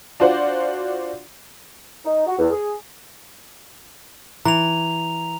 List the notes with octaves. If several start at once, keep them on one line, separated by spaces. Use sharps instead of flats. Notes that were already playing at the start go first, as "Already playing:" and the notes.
D4 F4 F#4 C5 D5 F#5
D#4
F#4
E2
G#4
E3 A#5 F7